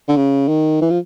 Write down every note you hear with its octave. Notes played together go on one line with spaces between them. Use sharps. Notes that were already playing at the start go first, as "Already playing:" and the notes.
D3
C#3
D#3
E3
F3